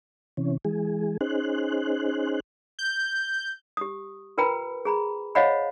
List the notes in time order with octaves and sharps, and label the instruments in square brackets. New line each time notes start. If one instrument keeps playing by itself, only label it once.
[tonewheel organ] C3 E3 C#4
E3 G#3 G#4
C#4 D#4 G#4 C5 F#6
[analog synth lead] G6
[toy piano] G4 D#6
F4 A#4 B4 G5 A#5 B5
G#4 A#5 B5
C5 C#5 D#5 F5 F#5 B5